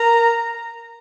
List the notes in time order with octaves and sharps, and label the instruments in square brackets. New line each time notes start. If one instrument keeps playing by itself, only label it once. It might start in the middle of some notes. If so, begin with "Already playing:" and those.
Already playing: [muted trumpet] A#4 [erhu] A#5